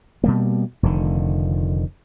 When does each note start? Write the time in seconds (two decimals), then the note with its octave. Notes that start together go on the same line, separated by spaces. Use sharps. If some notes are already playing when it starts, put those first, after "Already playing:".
0.24 B2 G3 A#3
0.83 F1 F2 D3 D#3